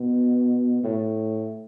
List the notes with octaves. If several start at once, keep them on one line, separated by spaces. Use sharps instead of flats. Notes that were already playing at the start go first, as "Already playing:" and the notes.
Already playing: B2
A2